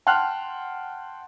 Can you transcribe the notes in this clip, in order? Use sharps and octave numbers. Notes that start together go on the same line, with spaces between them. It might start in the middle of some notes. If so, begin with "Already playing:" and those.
F#5 G5 A5 C6 F6 F#6